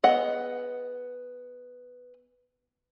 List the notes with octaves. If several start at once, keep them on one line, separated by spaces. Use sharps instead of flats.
B3 G#4 D#5 F#5